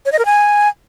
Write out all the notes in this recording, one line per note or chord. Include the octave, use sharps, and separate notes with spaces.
C#5
D#5
A#4
G#5